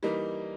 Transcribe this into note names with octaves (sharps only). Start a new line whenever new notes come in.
E3 G3 A#3 D#4